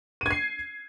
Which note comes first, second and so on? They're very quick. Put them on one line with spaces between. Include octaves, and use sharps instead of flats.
D#7 G#6 C7